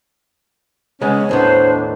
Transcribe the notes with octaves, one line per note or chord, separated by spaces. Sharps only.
C#3 G#3 B3 C#4 C#5
D#2 A2 B3 D4 C5